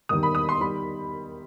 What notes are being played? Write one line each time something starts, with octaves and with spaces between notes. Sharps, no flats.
E1 D#2 D#3 G3 D#6
B5
D#6
C6
D#3 G3 B5